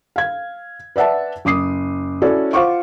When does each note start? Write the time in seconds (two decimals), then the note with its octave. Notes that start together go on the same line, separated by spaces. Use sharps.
0.16 F5 G#6
0.96 B4 D5 E5 F#5 A5
1.45 F#1 D6 D#6 C7
2.22 C#4 E4 F#4 A4 C#5 D5
2.53 F4 C5 F5 F#5 C#6 D6